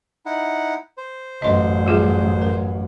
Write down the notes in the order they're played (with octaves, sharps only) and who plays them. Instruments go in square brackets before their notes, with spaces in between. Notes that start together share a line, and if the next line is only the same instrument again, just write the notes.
[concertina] D#4 E4 F#5
C5
[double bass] A1 F#2 [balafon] D#5 C6
[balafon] G3 F4 G#4
A#4